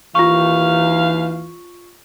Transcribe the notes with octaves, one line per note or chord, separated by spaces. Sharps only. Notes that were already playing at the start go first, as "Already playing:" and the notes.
D#2 E3 F4 F5 C#6